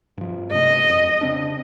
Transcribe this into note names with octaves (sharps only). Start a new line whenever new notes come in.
G2 F3
G2 C3 A3 D#5
F2
C#3 C4 D4